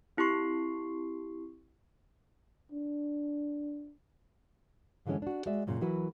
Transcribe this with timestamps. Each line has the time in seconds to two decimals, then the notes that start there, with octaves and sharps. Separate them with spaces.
0.17 C4 E4 G4 C6 C#6 C7
2.72 D4
5.06 F#2 D3 E3 G#3 C#4
5.22 D4 F#4
5.46 G#3 F#4 D5 E5
5.67 F#2 A#2 C#3
5.81 E3 F#3 E4 F#4 A#4 B4